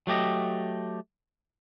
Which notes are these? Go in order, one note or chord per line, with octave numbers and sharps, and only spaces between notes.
F#3 A3 G4 D#5